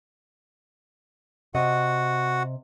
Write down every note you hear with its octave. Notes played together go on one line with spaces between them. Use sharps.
C3 F#4 D#5 F#5